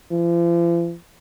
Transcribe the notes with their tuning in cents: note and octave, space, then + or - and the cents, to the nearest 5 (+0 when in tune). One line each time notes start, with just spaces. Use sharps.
F3 -45